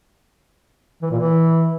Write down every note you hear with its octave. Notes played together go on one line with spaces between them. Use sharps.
E3
A#2
E3